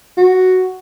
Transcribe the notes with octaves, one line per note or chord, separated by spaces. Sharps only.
F#4